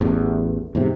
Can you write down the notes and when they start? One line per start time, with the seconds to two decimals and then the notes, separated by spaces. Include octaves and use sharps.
0.01 A1 E2
0.75 E2 G#2 C3